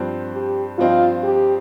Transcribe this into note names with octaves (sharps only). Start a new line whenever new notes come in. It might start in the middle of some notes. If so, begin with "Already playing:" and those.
Already playing: G2 F3 C4
G4
G2 F3 C4 D#4 F4
G4